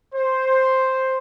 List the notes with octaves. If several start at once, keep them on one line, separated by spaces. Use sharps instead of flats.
C5